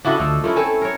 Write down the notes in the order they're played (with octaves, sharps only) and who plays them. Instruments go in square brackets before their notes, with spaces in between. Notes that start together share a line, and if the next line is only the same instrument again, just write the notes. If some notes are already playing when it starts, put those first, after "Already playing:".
[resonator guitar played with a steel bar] C#3 E4 F#4 [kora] D4 A4 D#5
[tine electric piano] D2 E6 [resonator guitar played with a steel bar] F3 [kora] A3
[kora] A3 C#4 E4 [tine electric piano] F4 A#4
[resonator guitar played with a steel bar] C4 A4 [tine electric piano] G#5
[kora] A#4 C#5